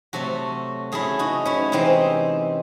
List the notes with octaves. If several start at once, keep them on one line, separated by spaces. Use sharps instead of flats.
C3 F#3 A3 F#4 A4
C#3 F#3 A3 E4 G#4
D#4 F#4
C#4 E4
C3 E3 G#3 C4 D#4